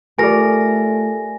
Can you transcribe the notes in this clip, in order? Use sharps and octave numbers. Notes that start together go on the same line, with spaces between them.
A3 F4 G4 A4 A#4 D5 G#5 A#6